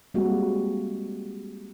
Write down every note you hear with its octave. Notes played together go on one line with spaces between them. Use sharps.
G3 G#3 A#3 C4 F#4